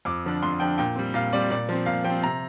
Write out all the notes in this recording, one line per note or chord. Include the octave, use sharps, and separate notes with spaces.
F2 D6
D3 F3 D4
F2 C6
D3 F3 D4 G5
A#2 G5
G3 C4
A#2 F5
G3 C4 D5
A#2 D5
F3 C4
A#2 F5
F3 G5
C4
C3 A#5